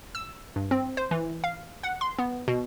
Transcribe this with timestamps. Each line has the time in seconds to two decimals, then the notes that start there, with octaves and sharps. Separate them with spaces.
0.15 E6
0.56 G2
0.71 C4
0.97 C5
1.11 E3
1.44 F5
1.83 F#5
2.01 C6
2.19 B3
2.48 B2